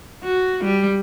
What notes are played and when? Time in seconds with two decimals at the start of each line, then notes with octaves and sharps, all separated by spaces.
0.24 F#4
0.64 G3